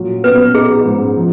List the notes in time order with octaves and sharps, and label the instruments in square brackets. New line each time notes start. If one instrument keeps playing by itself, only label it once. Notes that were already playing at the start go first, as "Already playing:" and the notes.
Already playing: [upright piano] A#2 F#3
[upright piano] B3 [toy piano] B4
[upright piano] D#4 [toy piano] G#4
[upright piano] G#2
F3